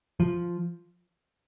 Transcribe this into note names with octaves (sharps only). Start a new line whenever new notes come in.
F3